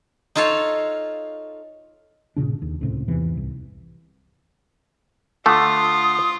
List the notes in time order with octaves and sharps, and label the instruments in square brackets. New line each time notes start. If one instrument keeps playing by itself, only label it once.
[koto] D#4 F4 A4 C#5 F5
[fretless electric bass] G1 A#2 C#3 D4
D#2
C#2 A2 C3
E2 G#2 C3 E3
C2
[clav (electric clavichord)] D3 A3 [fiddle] F4 [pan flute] D#6